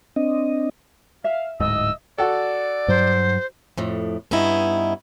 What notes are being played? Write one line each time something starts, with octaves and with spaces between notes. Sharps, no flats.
C4 D4 D#5
E5 F5
D1 G#2 D#5 E6
F#4 A4 D5
G2 F#3 C5
F2 A2
G2 B3 C#4 D#4 E4